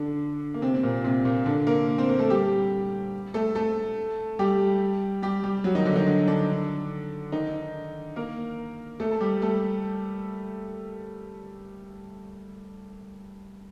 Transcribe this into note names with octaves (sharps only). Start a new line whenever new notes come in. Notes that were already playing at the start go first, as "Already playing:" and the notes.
Already playing: D3 D4
A#3
C3 C4
C4
A#2 A#3
C3 C4
A#2 A#3
D3 D4
A#3 A#4
C4 C5
A#3 A#4
A3 A4
G3 G4
A3 A4
A3 A4
G3 G4
G3 G4
G3 G4
F#3 F#4
D#3 D#4
D3 D4
D#3 D#4
D3 D4
D3 D4
D#3 D#4
A#3 A#4
A3 A4
A4
G3 G4
A3 A4